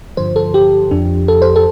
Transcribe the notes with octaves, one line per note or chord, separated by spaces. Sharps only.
G2 D3 F3 C5
A4
G4
F2 F3 D4
A4
C5
A4